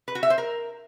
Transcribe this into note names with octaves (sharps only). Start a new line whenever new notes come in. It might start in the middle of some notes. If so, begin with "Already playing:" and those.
B4
F#4
E5
C5
A#4